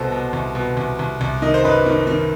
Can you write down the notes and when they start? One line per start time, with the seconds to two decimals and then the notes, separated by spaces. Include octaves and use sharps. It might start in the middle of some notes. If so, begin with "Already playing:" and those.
Already playing: C2 B2 A4 C5
0.12 B2
0.33 C2
0.55 B2
0.77 C2
0.99 C2
1.21 C2
1.42 D#3 D#5
1.54 C5
1.64 F#2 B4 D#5
1.86 D#3
2.07 D#3